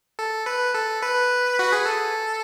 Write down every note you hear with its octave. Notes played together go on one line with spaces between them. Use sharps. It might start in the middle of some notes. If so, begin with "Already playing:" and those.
A4
B4
A4
B4
F#4
G#4
A4